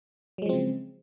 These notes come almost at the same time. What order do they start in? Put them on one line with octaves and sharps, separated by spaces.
F#3 G#3 F3 C4 C#3